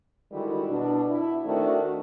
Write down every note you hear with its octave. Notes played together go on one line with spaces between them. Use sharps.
D3 D#3 G3 G#3 E4 F#4
B2 D4
E4
D#3 A3 C4 D4 F#4